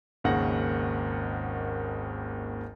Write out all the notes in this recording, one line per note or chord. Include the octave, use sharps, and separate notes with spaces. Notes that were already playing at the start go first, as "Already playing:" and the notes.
G#1 D#2 C#3 F#5 A#6